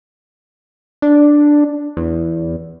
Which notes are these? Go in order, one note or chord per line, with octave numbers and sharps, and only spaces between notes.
D4
E2